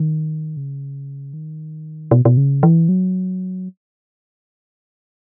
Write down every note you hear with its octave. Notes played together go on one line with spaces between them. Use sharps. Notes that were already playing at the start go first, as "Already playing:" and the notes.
Already playing: D#3
C#3
D#3
B2
B2
C#3
E3
F#3